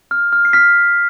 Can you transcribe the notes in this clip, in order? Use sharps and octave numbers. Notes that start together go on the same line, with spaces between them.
F6
F6
C7
F6 B6